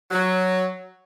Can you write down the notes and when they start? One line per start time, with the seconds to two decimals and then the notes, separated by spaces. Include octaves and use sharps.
0.11 F#3